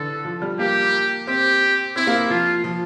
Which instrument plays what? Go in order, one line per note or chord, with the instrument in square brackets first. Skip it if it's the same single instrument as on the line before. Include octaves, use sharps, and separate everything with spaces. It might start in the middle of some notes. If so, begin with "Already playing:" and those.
Already playing: [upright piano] D3 E3 [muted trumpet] A4
[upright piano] F3
G3
[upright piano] A#3 [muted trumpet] G4
[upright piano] C4 [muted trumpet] G4
[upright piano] C4 [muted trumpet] E4
[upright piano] A#3
[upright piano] F3 [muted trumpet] F4
[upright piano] F3